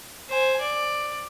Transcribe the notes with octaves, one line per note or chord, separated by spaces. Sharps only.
C5 G#5
D5